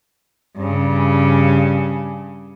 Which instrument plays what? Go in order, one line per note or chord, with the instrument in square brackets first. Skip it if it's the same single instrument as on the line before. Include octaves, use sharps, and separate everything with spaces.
[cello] G2 C#3